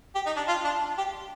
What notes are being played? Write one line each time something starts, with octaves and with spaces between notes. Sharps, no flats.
G4
D#4
D4
F4
D4
G4